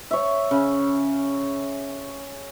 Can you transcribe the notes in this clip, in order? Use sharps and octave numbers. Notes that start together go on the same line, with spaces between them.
C#5 E5
C#3